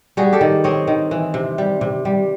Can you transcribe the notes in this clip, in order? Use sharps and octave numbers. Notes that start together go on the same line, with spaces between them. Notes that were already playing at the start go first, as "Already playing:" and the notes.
G3 F#4 G#4
G4 A4
D#3
C4 C#5 D#5
D#3
E3
C3
G3
C3
G3